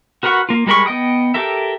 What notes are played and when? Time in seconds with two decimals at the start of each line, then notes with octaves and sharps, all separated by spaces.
0.23 F#4 A#4 B4 F#5 C#6
0.49 A#3 F4
0.66 G3 G#3 A#4 B5 C#6
0.86 B3 D#5 G5 D#6
1.34 G4 A4 A#4 E5